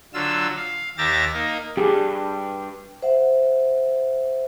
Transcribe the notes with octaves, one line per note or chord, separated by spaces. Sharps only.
D3 F#3 F4 E6
F5
D#2 G4 E5 A#5 A6
A#3 D#4 A#4
E2 G2 G4 G#4
C5 E5 F#5